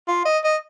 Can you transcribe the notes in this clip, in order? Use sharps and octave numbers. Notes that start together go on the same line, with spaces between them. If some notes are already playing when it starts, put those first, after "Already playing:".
F4
D#5
D#5